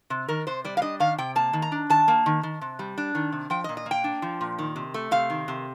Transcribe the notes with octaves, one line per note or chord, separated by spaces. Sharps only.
C3
D#3 A#4
C3 C5
G3 D5
F5
D4 D#5
D#3 F5
C3 G5
A#3 A5
D#3
A#5
D4
D#3 A5
A#3
D#3
D#3
C3
G3
D4
D#3
C3
F3 G5
D#5
A#2
D#5
A#3
G5
D4
F3
A#2
D#3
C3
A3
C3 F5
D#3
C3